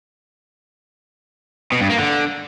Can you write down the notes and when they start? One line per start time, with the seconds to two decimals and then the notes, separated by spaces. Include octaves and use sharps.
1.72 B2
1.81 G2
1.90 A#3
1.99 D3